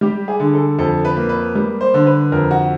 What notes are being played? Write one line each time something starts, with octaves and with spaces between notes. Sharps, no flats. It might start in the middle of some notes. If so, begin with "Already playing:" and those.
G3 G4
G#4
D3
A4
F2 A4
B4
A#3
B4
G3
C5
D3
B4
F2 A#4
F#4